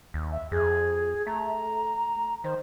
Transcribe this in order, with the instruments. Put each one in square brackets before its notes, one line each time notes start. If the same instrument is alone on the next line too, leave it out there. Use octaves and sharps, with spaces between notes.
[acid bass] D#2
[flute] E5
[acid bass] F2 [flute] G#4
[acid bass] A3 [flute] A#5
[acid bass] D#3 [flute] C5